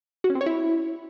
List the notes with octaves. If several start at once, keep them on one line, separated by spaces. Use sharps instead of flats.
F#4
C#4
C4
C#5
E4